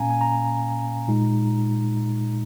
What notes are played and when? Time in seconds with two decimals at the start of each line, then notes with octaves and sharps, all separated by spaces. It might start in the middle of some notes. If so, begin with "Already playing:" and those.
Already playing: A#2 A#3 C#4 F5 G#5 A#5
0.10 G#5
0.21 A#5
1.07 A#2 G#3 D#4